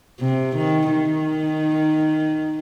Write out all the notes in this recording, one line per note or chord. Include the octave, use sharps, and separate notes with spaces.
C3
D#3
D#3